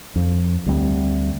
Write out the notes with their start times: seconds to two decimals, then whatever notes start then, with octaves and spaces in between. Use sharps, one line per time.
0.16 F2
0.66 D2 G3 B3 C4